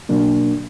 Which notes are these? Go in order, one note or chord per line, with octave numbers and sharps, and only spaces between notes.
B2 F#3 A#3 D4